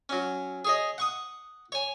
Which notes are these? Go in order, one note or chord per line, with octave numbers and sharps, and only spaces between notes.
F#3 C#4
G#4 C#5 D#5
F#5 C#6 D#6
C#5 G#5